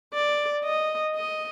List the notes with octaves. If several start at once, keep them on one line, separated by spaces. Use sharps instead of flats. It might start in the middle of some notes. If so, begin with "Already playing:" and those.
D5
D#5
D#5